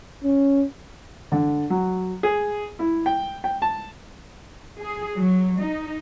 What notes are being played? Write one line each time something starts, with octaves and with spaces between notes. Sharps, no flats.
C#4
D3
F#3
G#4
E4
G5
G5
A5
G#4
F#3
D#4